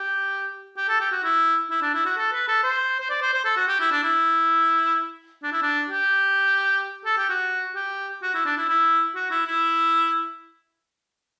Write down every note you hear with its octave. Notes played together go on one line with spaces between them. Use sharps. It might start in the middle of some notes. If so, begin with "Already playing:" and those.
Already playing: G4
G4
A4
G4
F#4
E4
E4
D4
E4
F#4
A4
B4
A4
C5
C5
D5
C5
C5
A4
F#4
G4
E4
D4
E4
D4
E4
D4
G4
A4
G4
F#4
G4
F#4
E4
D4
E4
E4
F#4
E4
E4